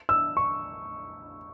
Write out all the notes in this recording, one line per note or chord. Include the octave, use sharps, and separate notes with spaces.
E6
C#6